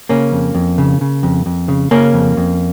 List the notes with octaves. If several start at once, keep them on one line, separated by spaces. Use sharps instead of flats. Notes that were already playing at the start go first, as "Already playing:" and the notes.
C#3 A#3 C#4
F2
F2
C#3
C#3
F2
F2
C#3
C#3 A#3 C#4
F2
F2